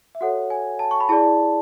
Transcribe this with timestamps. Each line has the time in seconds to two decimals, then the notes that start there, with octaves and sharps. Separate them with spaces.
0.15 E5
0.21 F#4 A4 C#5 F#5
0.50 G#5
0.79 A5
0.91 C#6
1.00 B5
1.09 E4 G#4 D5 A5